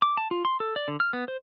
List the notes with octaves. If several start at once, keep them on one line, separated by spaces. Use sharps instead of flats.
D6
A5
F4
C6
A4
D5
D3
F6
B3
C5